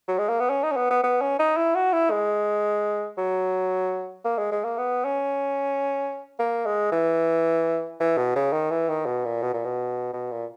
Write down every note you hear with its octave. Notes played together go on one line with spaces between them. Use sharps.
F#3
G#3
A#3
B3
C#4
D#4
C#4
B3
B3
B3
C#4
D#4
E4
F#4
E4
G#3
F#3
A#3
G#3
G#3
A#3
B3
C#4
A#3
G#3
E3
E3
B2
C#3
D#3
E3
D#3
B2
A#2
B2
A#2
B2
B2
A#2